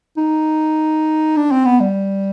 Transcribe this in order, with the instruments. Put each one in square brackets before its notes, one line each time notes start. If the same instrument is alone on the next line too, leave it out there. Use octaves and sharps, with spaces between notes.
[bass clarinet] D#4
D4
C4
B3
G3